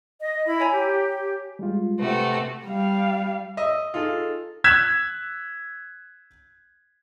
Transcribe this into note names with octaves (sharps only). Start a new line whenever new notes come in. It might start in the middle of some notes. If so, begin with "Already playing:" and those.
D#5
E4 B5
C#5 G#5 A#5
G4
G3 G#3 F4
C3 A3 F#4 B4
G3 F5
D#5 E5
D#4 F4 G#4 A4
E6 F#6 G#6 B6 E7